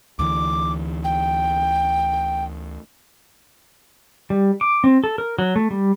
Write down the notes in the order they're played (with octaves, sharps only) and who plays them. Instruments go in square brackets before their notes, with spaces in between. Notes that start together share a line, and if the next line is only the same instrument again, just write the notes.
[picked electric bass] D2 D3 E3 [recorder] D6
[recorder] G5
[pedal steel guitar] G3
D6
C4
A4
A#4
F#3
A3
G3